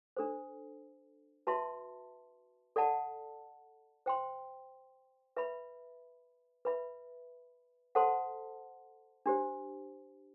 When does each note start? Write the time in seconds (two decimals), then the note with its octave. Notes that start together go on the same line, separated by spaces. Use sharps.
0.17 D4 A4 C5
1.47 F#4 B4 E5 A5 C6
2.76 A4 D5 F#5 A5
4.06 C5 G5 C6
5.37 B4 E5 B5
6.65 B4 E5 B5
7.95 A4 C5 F#5 A5 C6
9.26 D4 G4 C5